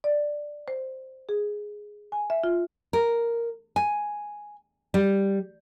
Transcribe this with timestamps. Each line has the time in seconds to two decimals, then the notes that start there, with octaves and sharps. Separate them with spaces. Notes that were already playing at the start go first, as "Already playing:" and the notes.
0.04 D5
0.68 C5
1.29 G#4
2.12 G#5
2.30 E5
2.44 F4
2.93 A#4
3.76 G#5
4.94 G3